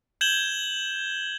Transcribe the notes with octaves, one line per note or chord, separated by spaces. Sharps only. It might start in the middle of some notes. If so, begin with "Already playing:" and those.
G6 G#6 E7 F#7 G7